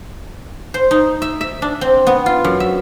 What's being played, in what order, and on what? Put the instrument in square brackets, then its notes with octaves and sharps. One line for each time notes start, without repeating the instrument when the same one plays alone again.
[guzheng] C5
D#4
E5
E5
D4
C4
B3
F4
F#2
E5